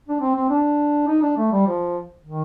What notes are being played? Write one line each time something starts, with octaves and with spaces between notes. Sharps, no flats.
D4
C4
C4
D4
D#4
D4
A3
G3
F3
D#3